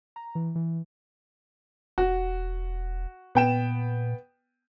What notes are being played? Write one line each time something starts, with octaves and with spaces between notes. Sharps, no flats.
A#5
E3
E3
E1 F#4
A#2 B3 G5 E7